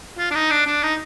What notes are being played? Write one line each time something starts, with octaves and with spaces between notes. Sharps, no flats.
F4
D4
D#4
D4
D4
D#4